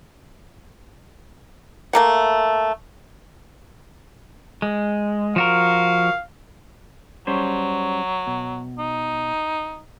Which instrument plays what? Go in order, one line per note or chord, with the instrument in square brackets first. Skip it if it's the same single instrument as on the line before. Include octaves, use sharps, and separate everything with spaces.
[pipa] A3 A#3 F#5
[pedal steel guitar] G#3
[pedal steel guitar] F3 F#4 A#4 [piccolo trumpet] F5
[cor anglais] F#3 [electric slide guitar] G3 C#4 C5
[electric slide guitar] B2
[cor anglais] D#4